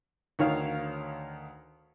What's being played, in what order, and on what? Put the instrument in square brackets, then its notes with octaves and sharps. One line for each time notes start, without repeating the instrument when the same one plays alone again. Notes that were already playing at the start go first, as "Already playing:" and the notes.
[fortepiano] D2 D#3 C#5 F5